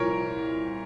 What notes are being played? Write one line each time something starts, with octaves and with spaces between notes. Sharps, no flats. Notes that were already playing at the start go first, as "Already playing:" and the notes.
Already playing: C2 A#2 F3 A#4 C#5